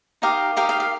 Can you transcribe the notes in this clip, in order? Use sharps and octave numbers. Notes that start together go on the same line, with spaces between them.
D#4 G4 A#4 F5
D#4 G4 A#4 F5
F5
F5